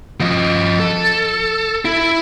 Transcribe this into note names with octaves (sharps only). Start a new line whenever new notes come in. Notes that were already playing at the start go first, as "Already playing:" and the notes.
F3 D#5
A4
E4